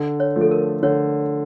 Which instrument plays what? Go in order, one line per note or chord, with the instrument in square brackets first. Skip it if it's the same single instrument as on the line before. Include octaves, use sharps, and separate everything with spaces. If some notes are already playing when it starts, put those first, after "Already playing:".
Already playing: [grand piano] D3
[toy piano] C#5
[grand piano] F3 A3
[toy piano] A4
A#4
[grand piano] D3 [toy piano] C#5